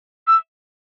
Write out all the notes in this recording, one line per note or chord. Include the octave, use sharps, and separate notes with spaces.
E6